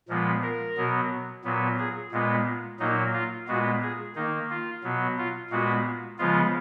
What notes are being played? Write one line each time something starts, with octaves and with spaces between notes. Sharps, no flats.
A#2 F3 G#3 B3
A#4
B2 F#3 B3
A#2 F#3 B3
G#4
A#2 G#3 B3
A#2 F#3 A#3 D#4
F4
A#2 G#3 B3 F#4
G#4
D#3 A#3 D#4
F4
B2 F#3 B3
F4
A#2 G#3 B3 F#4
C#3 F3 G#3 B3 F4